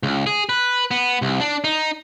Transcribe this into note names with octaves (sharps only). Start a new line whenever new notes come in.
C#2
G#4
B4
B3
C2
D4
D#4